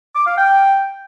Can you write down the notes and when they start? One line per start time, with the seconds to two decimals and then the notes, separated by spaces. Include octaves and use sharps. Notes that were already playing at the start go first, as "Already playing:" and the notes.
0.15 D6
0.26 F5
0.38 G5